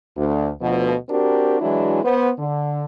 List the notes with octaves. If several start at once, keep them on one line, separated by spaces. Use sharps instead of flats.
D2
D2 B2 F3
C4 D4 F#4 G4 A#4
E3 F#3 G#3 D4 E4 F#4
B3 C5
D3